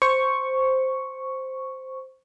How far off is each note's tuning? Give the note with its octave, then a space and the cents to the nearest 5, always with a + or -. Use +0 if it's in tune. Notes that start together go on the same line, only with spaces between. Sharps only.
C5 +0 C#6 +0